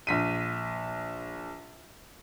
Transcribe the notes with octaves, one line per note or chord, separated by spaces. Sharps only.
A#1 B6 D#7